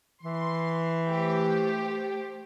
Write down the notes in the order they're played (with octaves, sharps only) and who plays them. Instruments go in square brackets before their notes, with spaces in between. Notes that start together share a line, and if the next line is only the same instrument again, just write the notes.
[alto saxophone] E3 [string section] C6
[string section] A3 G4 C5